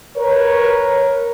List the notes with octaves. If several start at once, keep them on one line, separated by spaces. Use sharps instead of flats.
A#4 B4 C#5